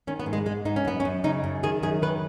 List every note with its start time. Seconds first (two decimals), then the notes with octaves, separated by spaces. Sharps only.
0.07 D#3 C#4
0.20 B3
0.26 G#2
0.33 G#3
0.46 G#2 G#3
0.65 G#2 D#4
0.76 C#4
0.85 F#2 B3
1.00 C#4
1.05 F#2
1.24 C#3 D#4
1.44 F#2
1.63 D#3 G#4
1.83 F#2 G#4
2.02 D#3 B4